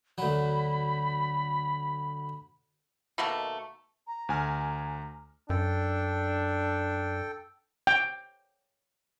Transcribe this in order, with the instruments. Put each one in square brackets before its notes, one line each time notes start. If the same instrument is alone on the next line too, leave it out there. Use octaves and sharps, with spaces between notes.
[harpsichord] D2 F#3 [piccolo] B5
[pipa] B2 D#3 A3 A#3
[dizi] A#5
[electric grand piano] D2 G#5 F6
[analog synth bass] F#2 [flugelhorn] D4 [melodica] A4 G5
[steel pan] G5